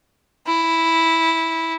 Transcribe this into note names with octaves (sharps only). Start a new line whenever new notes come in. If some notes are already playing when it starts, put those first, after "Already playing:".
E4